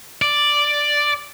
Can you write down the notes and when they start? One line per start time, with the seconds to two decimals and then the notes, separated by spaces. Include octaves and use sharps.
0.22 D5